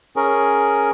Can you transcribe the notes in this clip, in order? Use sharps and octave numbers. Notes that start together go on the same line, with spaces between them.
C#4 G#4 A#4